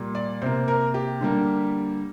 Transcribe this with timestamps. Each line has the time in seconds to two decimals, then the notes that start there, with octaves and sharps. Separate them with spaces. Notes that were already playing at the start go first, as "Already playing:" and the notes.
Already playing: A#2 G3 A#3
0.15 D5
0.42 C3 A#3 C5
0.68 A#4
0.94 G4
1.21 D3 G3 A#3